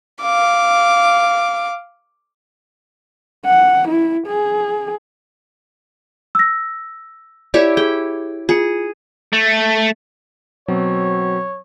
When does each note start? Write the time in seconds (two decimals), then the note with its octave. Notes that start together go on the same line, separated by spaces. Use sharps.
0.22 F5 D6
3.46 F#5
3.89 E4
4.27 G#4
6.35 E6 A#6
7.54 E4 G4 C#5 D5
7.77 G#4 G5
8.49 F4 G#4 C#7
9.33 A3
10.68 B2 F#3 C4 C#5